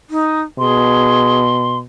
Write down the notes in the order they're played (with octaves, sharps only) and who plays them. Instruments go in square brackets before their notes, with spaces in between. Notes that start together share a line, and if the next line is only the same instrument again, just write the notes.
[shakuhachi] D#4
[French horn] B2 [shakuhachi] G#4 [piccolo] C6